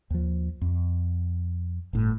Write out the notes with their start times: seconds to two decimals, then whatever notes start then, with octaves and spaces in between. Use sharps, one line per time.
0.10 D#2 F3
0.62 F2
1.93 G1 A2